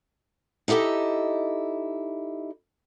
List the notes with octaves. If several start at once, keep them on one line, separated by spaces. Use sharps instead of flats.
D#4 E4 G4 A4 D#5